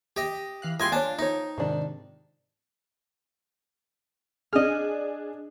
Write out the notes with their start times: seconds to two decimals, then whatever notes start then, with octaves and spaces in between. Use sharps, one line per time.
0.17 G4 D#5
0.62 E3 F5 F#6
0.80 G#3 E4 F4 G4 D#5 G5 G#5 C6
0.92 D4 C#5 G#5 A5
1.19 F3 D#4 C#5
1.58 G#2 C3 D#3 F3 D4
4.53 D4 G#4 D#5 F6